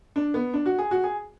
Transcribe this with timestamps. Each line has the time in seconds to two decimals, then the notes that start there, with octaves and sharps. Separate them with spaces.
0.16 D4
0.34 B3
0.54 D4
0.66 F#4
0.78 G#4
0.91 F#4
1.04 G#4